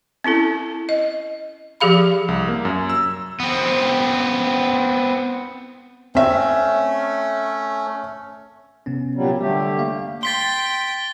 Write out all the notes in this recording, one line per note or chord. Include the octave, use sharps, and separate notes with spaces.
C4 C#4 E4 A4
D#5
F3 G4 G#4 F5 B5
C2
A#3
F#2
E6
B3 C4
A3 C4 C#4 E5
C3 B3 C#4
A#2 F#3 G3
D3 G3 A3 G4
A#3 F5
G5 C6 A6 B6 G7